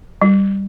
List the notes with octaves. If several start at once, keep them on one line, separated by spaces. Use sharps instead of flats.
G3